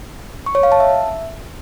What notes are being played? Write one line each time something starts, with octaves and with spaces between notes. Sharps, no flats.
C#6
C#5
F5
A5
E5